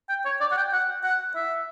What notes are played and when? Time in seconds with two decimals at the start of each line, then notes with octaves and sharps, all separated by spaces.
0.09 G5
0.25 C#5
0.41 D5
0.52 F#5
0.57 G5
0.73 F#5
1.04 F#5
1.35 E5